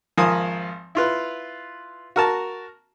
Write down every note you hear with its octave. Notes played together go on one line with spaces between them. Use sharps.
G#1 F3 A#4 G#5 D#6
E4 F4 B4
F#4 A#4 A5